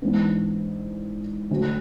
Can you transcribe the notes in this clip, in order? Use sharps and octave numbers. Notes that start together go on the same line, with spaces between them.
G#2 E3 B3 D4
D2 D3 F#3